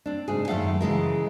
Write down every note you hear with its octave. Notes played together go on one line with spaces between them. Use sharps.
C4 D4
G#2 C#3 G#4
F#2 D#3 G#3 A3 F5 F#5
C#3 E3 G#3 A#4